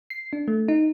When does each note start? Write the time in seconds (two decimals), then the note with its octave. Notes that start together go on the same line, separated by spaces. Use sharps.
0.10 C7
0.33 D4
0.48 A3
0.68 D#4